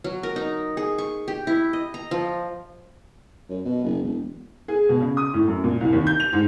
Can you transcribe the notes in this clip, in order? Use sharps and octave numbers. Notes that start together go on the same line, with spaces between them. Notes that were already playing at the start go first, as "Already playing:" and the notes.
F#3
A#4
D#4
G#4
C#6
G4
E4
D#5
A#5
F3
F#2
B2
F#1
E1
G#4
B2
C#3
D#6
A2
F#2
A#2
C2
D#2
G6
F7
G#2